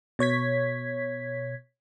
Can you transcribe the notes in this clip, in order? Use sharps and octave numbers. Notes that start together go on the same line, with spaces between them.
B2 C#5 G#6 B6